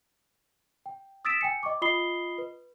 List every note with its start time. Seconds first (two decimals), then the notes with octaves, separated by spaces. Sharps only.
0.86 G5
1.25 D#6 E6 A6 B6 D7 E7
1.41 G5 G#5 C#7
1.63 D#5 G5 C#6 D6
1.82 F4 D#5 B5 D#6 C7 G7
2.38 B4